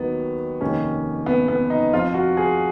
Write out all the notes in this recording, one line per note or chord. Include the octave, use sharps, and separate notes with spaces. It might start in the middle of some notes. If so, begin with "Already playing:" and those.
Already playing: D#2 D#3 F#3 B3
F1 D#2 D#3 C#4
B3
B3
D#4
F2 F3 F4
F#4
G#4